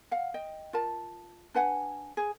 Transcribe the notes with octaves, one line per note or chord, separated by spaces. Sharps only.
F5 F#5
D#5 G5
F4 A#4 A5
D4 B4 F#5 G#5
G#4